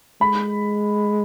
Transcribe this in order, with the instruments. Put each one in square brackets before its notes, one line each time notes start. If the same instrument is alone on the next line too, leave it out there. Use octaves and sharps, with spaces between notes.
[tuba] G#3 [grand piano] B5